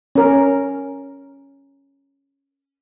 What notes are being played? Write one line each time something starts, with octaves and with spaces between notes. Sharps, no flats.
C#4 A#4